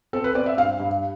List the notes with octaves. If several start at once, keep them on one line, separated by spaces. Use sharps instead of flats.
C4 A4
B4
C4 D5
E5
G2 F5
G2